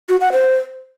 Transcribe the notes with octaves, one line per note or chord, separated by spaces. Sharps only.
F#4
F#5
C5